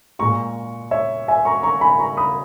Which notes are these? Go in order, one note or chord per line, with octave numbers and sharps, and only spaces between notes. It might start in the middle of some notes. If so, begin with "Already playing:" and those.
A#2 G#3 A#5 C#6
C#5 E5
E5 G#5
A#5 C#6
A#5 C#6
G#5 B5
A#5 C#6
B5 D#6